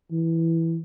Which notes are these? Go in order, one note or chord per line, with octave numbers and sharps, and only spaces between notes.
E3